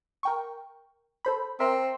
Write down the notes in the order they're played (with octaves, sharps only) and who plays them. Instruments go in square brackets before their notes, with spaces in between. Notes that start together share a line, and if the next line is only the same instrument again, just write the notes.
[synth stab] A#4 G5 C#6
A4 C5 B5
[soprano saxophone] C4 [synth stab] A#4 E5 A#5